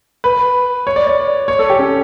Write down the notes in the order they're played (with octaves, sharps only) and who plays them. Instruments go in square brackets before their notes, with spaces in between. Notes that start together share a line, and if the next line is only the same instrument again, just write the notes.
[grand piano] B4
C#5
D5
D5
C#5
A4
G4
C#4